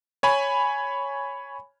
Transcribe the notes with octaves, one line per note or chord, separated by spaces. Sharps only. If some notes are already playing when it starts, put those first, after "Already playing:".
C#5 G#5 B5